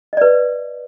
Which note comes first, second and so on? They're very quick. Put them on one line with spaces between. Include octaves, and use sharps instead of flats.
D#5 D5 B4